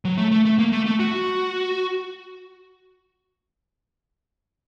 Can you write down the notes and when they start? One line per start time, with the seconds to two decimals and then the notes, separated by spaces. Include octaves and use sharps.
0.05 F#3
0.17 A3
0.31 A3
0.45 A3
0.59 A#3
0.72 A3
0.86 A3
1.00 F#4